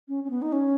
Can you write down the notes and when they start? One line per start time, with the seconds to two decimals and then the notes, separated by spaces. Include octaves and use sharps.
0.08 C#4
0.24 C#4
0.30 B3
0.42 D#4
0.52 C#4